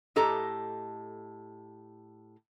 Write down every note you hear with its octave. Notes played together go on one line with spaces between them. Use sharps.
A2 G4 A4 D#5 A#5